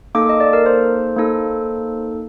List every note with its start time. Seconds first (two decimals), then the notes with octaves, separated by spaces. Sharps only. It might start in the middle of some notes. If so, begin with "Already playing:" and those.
0.15 A#3 D#4 A4 D6
0.29 D#5
0.40 D5
0.53 A#4
0.66 C5
1.17 A#3 D#4 A4